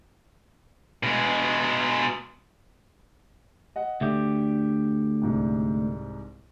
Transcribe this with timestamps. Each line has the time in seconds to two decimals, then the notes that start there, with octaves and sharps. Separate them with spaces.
1.03 B2 G#3
3.76 D#5 F#5
4.01 D2 D3 G4 E5
5.22 C2 G#2 C3